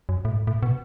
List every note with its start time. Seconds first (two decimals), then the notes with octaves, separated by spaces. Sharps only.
0.09 F#2
0.25 A2
0.32 G#2
0.47 A2
0.63 B2